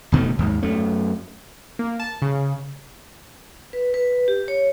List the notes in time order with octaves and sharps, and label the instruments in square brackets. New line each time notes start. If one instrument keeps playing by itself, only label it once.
[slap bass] D#1 B2 D#3 A3
D#2 G#2
F#2 A3
[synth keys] A#3
A5
C#3
[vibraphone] B4
B4
G4
C#5